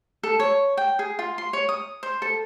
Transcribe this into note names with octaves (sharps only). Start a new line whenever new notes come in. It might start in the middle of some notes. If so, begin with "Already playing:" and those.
A4
C#5
G5
G#4
F4
C6
C#5
D#6
C5
A4